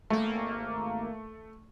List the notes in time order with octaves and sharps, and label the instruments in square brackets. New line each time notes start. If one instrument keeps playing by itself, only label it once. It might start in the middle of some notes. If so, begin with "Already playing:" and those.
[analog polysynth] G#1 A#3 [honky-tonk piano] A3